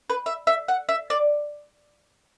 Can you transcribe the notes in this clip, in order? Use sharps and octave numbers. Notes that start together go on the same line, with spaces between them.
B4
E5
E5
F#5
E5
D5